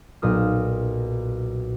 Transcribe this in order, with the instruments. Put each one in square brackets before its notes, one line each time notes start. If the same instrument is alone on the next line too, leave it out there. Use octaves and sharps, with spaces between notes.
[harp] B1 A#2 D#6 F6